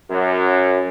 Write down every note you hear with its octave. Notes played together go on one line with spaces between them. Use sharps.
F#2